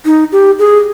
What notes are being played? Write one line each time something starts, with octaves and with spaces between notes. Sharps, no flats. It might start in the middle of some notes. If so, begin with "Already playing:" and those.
D#4
G4
G#4